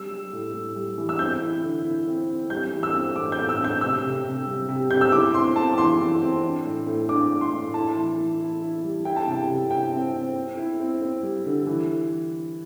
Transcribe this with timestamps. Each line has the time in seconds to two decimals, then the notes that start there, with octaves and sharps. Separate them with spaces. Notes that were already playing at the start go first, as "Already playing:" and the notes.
Already playing: G3 E6
0.11 G3
0.33 A2
0.54 A2
0.76 G3
0.98 E3
1.09 E6
1.19 C4 G6
1.42 E4
1.63 D3
1.84 E4
2.07 C4
2.28 C4
2.50 G3 G6
2.72 E3
2.83 E6
2.94 C4
3.15 A2 D6
3.32 G6
3.37 A2
3.49 E6
3.60 C4 G6
3.81 C3 E6
4.04 C3
4.25 C3
4.46 G3
4.69 C3
4.91 C3 G6
5.01 E6
5.12 E4 D6
5.34 C4 C6
5.56 C4 A5
5.73 D6
5.78 E3 C6
5.99 E3
6.22 C4
6.43 D4
6.65 A2
6.87 A2
7.09 D4 D6
7.31 A2
7.41 C6
7.52 A2
7.74 E4 A5
7.96 E3
8.18 E3
8.39 E4
8.61 E4
8.84 G3
9.05 E4 G5
9.16 A5
9.26 C3 G5
9.48 C3
9.71 E4 G5
9.92 C4
10.14 C4
10.35 C4
10.57 E4
10.80 C4
11.01 C4
11.23 G3
11.46 D3
11.67 E3